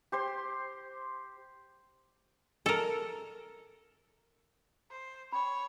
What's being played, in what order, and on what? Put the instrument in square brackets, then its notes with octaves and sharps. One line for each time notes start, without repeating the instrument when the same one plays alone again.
[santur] G4 C5 C6
[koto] A4 A#4
[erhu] C5
[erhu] C#5 [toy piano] G5 B5